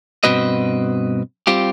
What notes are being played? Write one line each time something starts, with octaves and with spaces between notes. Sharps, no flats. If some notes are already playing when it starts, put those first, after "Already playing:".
G2 B2 C4 F#4 B4 D#5
G3 C4 F4 G4